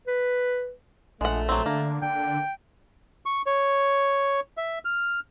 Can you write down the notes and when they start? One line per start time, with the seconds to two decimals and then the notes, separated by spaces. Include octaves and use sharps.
0.07 B4
1.21 A#1 G#3 A3 F#5
1.49 F#3 C4
1.66 D3 A#3
2.02 D3 G5
3.26 C#6
3.46 C#5
4.57 E5
4.85 F6